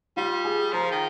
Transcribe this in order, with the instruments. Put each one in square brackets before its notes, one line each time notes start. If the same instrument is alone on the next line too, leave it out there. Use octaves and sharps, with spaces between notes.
[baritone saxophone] G3 [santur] F4
[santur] G#4
[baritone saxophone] F3 [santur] A#4
[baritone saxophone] D#3